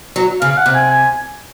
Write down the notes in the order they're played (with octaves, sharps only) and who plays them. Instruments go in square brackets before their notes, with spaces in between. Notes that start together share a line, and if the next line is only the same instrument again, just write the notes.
[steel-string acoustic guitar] F#3
[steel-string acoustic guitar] C#3 [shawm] F5
[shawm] F5
F#5
[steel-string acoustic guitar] C3
[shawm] G#5
G#5